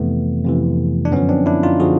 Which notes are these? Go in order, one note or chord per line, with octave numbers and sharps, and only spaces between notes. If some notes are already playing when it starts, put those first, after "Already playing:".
Already playing: F2 C3 E3 A3 B3
F2 C3 E3
D4
F#2 D3 F3 B3 C#4
C4 D4
D4 E4
D#4 F4
D3 F3 F#4 G#4